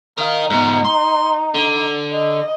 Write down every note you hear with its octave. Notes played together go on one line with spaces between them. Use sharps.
A#4 D#5 F5
G#2 B2 D#4
C6
D3
D#5